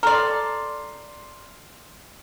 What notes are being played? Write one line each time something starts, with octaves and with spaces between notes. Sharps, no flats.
A4 D5 A#5 C6 F6